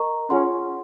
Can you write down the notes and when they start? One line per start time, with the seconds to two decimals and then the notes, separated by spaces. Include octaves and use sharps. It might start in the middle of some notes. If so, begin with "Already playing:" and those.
Already playing: A#4 D#5 A#5 C#6
0.30 C#4 F4 G#4 C#5 F#5 C6